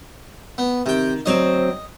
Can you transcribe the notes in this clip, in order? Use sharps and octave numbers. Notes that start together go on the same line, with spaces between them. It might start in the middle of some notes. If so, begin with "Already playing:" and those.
B3
C3 D#3 G5
D2 F#3 C4 D#5